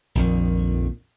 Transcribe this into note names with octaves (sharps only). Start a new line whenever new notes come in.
A#1 F2 D#3